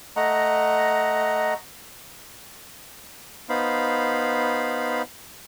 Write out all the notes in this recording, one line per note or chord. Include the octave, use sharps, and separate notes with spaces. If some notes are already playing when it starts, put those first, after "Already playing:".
A3 D#5 F#5 A#5
B3 D#4 C5 F5 B5